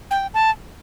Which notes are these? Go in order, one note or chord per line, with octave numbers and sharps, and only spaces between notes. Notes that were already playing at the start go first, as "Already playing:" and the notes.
G5
A5